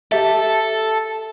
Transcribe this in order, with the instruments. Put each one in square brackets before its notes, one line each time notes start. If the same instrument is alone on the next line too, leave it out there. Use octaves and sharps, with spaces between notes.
[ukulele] G4 E5 [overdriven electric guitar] A4